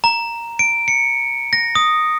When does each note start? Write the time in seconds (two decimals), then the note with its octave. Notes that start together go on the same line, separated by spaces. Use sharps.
0.04 A#5
0.59 D7
0.88 C#7
1.53 A#6
1.75 D#6